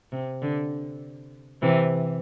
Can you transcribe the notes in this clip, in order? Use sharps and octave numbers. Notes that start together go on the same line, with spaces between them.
C3
D3
C3 E3